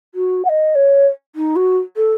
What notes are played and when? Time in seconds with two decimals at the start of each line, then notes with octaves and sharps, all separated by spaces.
0.14 F#4
0.44 F#5
0.49 D#5
0.75 C#5
1.35 D#4
1.56 F#4
1.96 A4